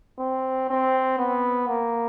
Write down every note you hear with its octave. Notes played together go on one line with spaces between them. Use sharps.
C4
C4
B3
A#3